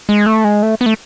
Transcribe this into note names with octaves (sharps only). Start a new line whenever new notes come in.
G#3
A3
G#3
A3
B3
A3